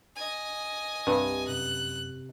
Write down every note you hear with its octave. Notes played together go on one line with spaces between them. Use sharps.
D#5 G#5
C2 G2 C3
F#2 F#6